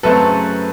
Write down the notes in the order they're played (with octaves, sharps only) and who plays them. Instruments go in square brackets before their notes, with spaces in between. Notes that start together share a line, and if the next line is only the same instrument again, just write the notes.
[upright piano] F#2 C#3 F#3 A3 C4 A4 B4